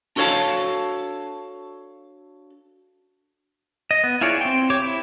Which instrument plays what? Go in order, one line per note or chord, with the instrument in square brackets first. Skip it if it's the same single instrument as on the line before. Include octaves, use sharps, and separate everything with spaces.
[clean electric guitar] D4 F#4 A4 C#5 F5 A5
[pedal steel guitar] D#5
B3
E4 F4 G#4 C#5 D5
C4 G5
G4 C#5 D6
E4